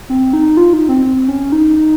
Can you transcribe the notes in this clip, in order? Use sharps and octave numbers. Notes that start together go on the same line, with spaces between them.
C4
D#4
F4
D#4
C4
C4
C#4
D#4